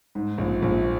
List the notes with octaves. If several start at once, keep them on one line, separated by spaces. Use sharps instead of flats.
G#2
A#1
A#1